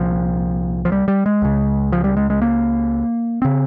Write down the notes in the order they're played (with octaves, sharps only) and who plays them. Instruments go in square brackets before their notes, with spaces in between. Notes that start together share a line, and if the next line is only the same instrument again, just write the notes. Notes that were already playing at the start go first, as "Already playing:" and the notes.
Already playing: [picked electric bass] C2 A#2 F3
F3
G3
G3
G#3
C#2 C#3
F3
G3
G#3
G#3
A#3
C#3 C4